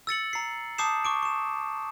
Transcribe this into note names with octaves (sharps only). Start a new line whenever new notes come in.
E6 A6 C#7 F#7
A#5 C7
A5 D6 D#6 G6 C7 E7
C#6 D6 D7
C#6 E7